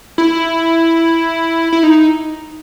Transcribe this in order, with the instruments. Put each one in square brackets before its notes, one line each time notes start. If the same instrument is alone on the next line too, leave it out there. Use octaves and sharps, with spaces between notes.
[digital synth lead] E4
E4
D#4